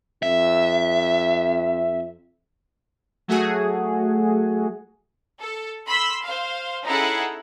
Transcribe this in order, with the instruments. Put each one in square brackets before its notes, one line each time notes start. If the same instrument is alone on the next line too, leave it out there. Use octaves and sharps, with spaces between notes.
[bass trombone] F2 [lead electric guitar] E5
[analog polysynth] F#3 A3 F#4 G#4
[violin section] A4
B5 C6 E6 B6
C5 F5
C#4 D#4 E4 G#4 A4 F#5